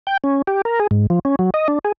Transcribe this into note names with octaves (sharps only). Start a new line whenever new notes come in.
G5
C#4
G4
A#4
G#4
G#2
F3
C#4
F#3
D#5
D4
G#4